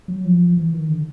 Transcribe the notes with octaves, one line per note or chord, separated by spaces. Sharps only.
F#3
F3
E3
D#3
D3